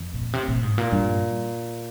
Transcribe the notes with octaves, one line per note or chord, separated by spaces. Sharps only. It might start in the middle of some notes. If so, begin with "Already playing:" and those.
Already playing: F2
A#2
C3
A#2
G#2
A#2
G2